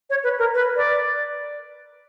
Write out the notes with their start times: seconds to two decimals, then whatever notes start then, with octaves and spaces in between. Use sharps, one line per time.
0.10 C#5
0.24 B4
0.39 A#4
0.54 B4
0.77 D5